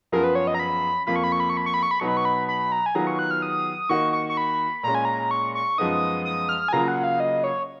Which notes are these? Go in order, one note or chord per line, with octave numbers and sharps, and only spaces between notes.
F#2 F3 B3 F4 G#4 A#4
B4
C#5
D#5
A#5
B5
F2 F3 A#3 F4 B5
C#6
B5
C#6
B5
C#6
B5
C#6
B5
C#6
B5
B2 F#3 B3 D#4 C#6
B5
C#6
B5
B5
A#5
G#5
D#3 F#3 B3 F4 G#4 A#5
C#6
F#6
F6
D#6
D#3 A#3 D#4 F#4 C#6
C#6
C#6
B5
A#2 G#3 C#4 A#5
G#5
A#5
C#6
C#6
F#2 F3 G#3 B3 D#4 D#6
D#6
F6
G#5
C#3 F#3 A#3 F4 G#4 A#5
F#5
F5
D#5
C#5